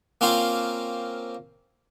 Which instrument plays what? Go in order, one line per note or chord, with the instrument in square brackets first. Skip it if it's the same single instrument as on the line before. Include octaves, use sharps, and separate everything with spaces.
[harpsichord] A#3 C4 C#4 F4 C5 F5